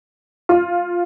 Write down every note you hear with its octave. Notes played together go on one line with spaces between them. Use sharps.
F4